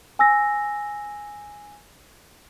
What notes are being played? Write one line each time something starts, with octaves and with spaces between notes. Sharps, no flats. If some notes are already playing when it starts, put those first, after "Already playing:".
G#5 E6 A#6